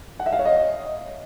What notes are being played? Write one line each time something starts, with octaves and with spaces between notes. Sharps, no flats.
F#5
E5
F5
C#5
D#5